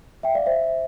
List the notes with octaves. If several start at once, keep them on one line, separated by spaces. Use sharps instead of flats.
E5 G5
D5 F5
C5 E5